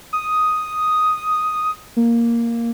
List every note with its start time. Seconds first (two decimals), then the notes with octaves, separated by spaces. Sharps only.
0.13 D#6
1.96 A#3